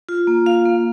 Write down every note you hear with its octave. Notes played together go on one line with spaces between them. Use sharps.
F4
A#3
F4 F5
A#3